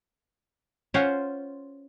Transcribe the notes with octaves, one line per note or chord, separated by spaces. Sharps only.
C#4 F4 C5 C#5 F#5